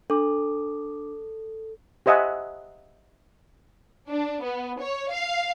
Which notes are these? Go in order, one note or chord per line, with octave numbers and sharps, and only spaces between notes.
D4 A4 D6
G4 C5 D#5 E5 F#5 G#5
D4
B3
C#5
F5